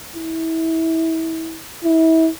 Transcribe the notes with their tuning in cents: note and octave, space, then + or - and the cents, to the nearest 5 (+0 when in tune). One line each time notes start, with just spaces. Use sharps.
E4 -25
E4 -30